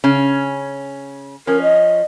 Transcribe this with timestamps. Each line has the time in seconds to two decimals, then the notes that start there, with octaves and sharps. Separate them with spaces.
0.04 C#3 C#4
1.47 F3 C#4 A#4
1.62 D#5